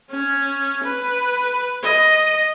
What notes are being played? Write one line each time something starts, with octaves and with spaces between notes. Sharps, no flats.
C#4
B4
D#5